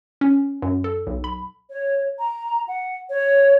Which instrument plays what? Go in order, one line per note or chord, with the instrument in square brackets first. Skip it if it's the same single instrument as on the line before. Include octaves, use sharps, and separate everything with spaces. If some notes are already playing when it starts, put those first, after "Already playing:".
[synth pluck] C#4
F#2
A4
B1
B5
[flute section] C#5
A#5
F#5
C#5